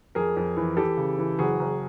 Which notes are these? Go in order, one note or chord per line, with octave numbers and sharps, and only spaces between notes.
F2 G#4 A#4
F2
E3
E3 G4 A4
C#3
E3
F#1 F#4 G#4
F#1